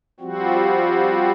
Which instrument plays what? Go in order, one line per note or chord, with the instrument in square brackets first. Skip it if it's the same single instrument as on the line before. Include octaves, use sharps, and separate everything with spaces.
[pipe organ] F3 G3 C4 F#4